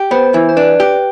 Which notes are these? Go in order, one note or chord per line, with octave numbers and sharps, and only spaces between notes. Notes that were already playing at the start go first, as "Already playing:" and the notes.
Already playing: G4
B3 C5
E3
C5
D4 B4
G4